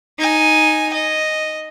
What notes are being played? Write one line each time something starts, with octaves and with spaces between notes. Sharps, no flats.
D#4 G#5
D#5